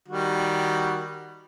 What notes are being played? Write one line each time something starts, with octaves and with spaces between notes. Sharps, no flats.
D#3 G3 F#4